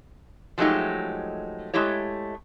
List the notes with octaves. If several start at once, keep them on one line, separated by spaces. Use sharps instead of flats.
F3 F#3 G#3 A3 D#4 G4
G#3 A3 E4 G4 C#5